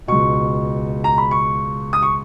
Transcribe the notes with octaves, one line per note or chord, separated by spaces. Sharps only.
C#2 B2 C#6
A#5
B5
C#6
D#6
C#6